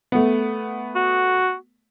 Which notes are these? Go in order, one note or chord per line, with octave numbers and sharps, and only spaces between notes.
A3 B3
F#4